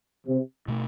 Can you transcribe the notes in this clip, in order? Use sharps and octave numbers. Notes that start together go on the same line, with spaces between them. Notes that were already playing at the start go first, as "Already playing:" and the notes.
C3
B2 A3